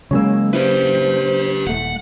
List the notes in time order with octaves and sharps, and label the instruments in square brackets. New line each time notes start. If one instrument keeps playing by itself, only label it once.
[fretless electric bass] C#3 F#3 A#3 [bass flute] G#3 [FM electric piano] C#5 G#5 E6
[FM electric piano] E4 [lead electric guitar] G4 B4 [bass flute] C5
[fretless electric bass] D#1 A3 [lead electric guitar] F#5